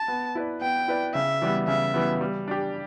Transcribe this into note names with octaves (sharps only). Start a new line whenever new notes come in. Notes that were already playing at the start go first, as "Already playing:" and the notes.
Already playing: A5
B3
E4 B4 D5
B3 G5
E4 B4 D5
C#3 E5
E3 G3 B3
C#3 E5
E3 G3 B3
G3
D4 G4